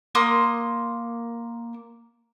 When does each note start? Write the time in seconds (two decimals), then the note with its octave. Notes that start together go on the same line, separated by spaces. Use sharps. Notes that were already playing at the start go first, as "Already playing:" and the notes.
0.15 A#3 C6 D#6